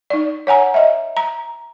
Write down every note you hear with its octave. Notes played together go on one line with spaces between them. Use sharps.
D#4 D5
C#5 F#5 G#5 A#5
D#5 E5
A#5